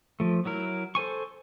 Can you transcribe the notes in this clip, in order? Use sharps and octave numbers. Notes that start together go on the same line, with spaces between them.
F3 A3
F#3 E4 A#4
A4 C5 G#5 C#6